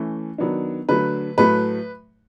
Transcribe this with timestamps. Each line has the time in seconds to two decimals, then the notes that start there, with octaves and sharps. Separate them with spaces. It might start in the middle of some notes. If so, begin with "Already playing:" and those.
Already playing: E3 A3 C#4
0.38 D#3 F#3 B3 D4
0.89 D3 F#3 A3 B4
1.38 A2 F#3 A3 B4